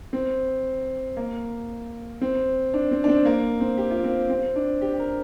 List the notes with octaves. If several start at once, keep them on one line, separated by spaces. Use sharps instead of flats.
C4
A#3
C4
D4
C4
D4
C4
A#3
C4
G4
F4
C4
C4
D4
G4
G4
A#4